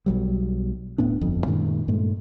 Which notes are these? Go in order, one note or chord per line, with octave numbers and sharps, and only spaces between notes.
B1 F#3 G3
D1 A2 B3 D4
D1 G1 F2
F#2 A#2 D#3 G#3
G2 A#2 G#3 A3